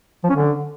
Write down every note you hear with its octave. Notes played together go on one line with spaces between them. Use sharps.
F3
C#4
D3